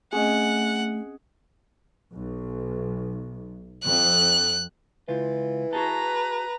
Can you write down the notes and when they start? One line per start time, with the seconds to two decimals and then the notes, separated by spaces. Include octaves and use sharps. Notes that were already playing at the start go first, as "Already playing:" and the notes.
0.12 A3 C4 C#4 G#4 D#5 F#5
2.13 B1
3.85 F2 F#6
5.08 C#2 E3 F4
5.73 F#4 G#4 A4 B4 A#5